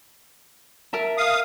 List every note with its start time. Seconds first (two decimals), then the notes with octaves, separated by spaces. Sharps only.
0.93 A#4 E5 A5
1.18 F5 D#6